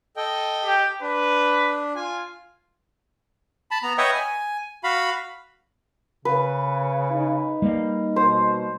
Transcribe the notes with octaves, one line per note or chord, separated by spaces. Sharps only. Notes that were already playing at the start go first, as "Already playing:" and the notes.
A4 D#5 G5
G4
D4 B4
F4 G#5
A5 B5
B3 A#5
B4 C#5 D#5 E5 F#5 G5
G#5
F#4 F5 B5
C#3 B4
D#4
G3 A#3
B2 C5